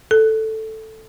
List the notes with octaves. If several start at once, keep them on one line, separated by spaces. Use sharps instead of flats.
A4